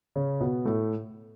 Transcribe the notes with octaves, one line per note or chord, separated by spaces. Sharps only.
C#3 C#4
B2 B3
A2 A3